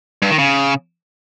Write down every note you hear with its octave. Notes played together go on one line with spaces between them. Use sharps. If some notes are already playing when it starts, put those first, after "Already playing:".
G2
D#3
C#3